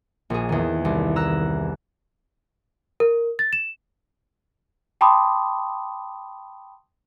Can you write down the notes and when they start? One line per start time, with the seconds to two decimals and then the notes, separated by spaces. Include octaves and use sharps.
0.30 A#1 G#4
0.49 E2 D#3
0.85 C2
1.16 A#5 E6 F#6
3.00 A#4
3.39 A6
3.53 E7
5.01 G5 A5 B5 C6 D6 D#6